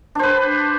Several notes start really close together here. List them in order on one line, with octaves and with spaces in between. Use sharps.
D4 C5 B4